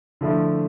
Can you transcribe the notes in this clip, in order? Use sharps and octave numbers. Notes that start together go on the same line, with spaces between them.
D3 F3 A3 E4